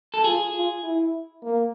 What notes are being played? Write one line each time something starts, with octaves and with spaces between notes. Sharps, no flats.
A4
F4 G#4
F4
E4
A#3